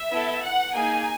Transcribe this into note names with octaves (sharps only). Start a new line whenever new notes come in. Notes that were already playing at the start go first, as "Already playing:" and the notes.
Already playing: E5
B3 E4 A4
F#5
A#3 D#4 G#4 G#5